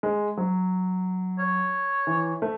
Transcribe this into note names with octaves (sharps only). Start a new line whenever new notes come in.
G#3
F#3
C#5
E3
A3